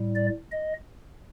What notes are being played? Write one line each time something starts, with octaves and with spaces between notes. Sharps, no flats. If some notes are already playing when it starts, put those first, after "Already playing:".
Already playing: A2 G3
D5
D#5